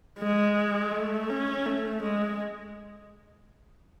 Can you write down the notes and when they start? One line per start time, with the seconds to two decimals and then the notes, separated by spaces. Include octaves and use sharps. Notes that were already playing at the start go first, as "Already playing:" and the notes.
0.19 G#3
0.92 A3
1.29 C#4
1.65 A3
2.02 G#3